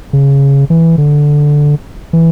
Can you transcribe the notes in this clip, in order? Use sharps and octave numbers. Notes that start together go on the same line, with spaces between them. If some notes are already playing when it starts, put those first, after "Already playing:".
C#3
E3
D3
E3